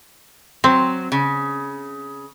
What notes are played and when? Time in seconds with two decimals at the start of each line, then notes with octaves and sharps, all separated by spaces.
0.64 F#3 C4
1.12 C#3